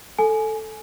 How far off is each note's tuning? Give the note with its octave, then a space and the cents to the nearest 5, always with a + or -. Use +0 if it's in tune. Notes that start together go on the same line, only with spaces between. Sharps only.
A4 +0 G#5 +20